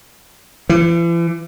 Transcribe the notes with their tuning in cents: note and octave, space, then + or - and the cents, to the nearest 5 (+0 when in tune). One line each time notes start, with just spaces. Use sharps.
E3 +40